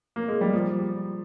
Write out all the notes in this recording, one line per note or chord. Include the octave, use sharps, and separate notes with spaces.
A#3
G#3
G3
F3